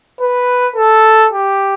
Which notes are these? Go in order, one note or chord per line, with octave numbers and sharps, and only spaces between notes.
B4
A4
G4